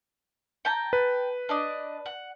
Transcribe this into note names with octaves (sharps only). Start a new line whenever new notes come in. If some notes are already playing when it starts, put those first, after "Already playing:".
G5 A5 A#5
B4
D4 D#5 D6
F#5